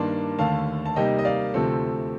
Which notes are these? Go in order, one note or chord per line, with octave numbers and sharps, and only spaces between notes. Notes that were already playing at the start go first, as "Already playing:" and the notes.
Already playing: G2 D#3 A#3 D4 A5 C6
D#2 D3 A3 F5 A5
A5
C3 G3 A#3 D#4 D#5 G5
D#5
D5 F5
D2 C3 F3 A3 C4 A4